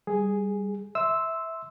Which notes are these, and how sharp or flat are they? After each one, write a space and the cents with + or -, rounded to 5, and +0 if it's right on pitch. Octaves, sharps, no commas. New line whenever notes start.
G3 +5 G#4 +0
E5 -15 C6 +0 E6 -5